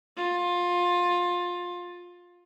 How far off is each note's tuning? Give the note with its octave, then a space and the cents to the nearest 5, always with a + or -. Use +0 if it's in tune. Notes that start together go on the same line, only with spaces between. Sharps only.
F4 +20